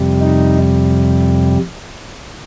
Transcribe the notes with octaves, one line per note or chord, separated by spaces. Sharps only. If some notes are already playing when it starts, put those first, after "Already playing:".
Already playing: F2 C3 G3
D#4